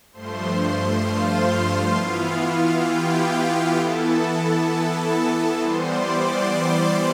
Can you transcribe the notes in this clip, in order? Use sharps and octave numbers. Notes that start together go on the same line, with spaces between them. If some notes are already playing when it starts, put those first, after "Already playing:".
G2 F3 A3 C5 C6
F4 F5
E3 B3 E4 F4 F5
G4 G5
E3 B3 E4 A4 A5
E3 G3 B3 C5 C6
D5 D6
D5 D6
C5 C6